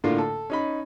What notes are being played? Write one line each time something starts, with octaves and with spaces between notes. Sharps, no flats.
A2 D3 A#3 D4 F4
A4
C#4 D#4 B5